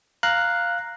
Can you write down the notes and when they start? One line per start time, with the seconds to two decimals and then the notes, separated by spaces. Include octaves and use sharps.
0.23 F5 A#5 F#6